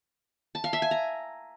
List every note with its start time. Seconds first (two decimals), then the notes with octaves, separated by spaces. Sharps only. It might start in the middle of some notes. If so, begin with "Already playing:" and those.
0.55 A5
0.64 F5
0.73 E5
0.82 G#5
0.91 A#5